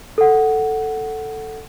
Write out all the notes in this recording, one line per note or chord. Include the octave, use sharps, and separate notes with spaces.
A4 F#5